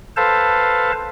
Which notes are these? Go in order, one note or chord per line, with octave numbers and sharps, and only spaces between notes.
A4 B4 C5 F5 A5